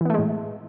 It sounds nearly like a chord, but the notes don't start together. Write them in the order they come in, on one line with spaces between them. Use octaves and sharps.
E3 B3 A3 G#3 A2